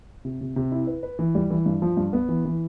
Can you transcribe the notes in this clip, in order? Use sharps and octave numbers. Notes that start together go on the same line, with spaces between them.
C3
C3
C3
E4
B4
B4
E3
G3
E3
G2
F3
G2
B3
E3
E3